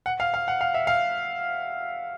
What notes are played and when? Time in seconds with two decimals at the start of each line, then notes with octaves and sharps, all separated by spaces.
0.06 F#5
0.20 F5
0.34 F5
0.48 F#5
0.61 F5
0.74 E5
0.87 F5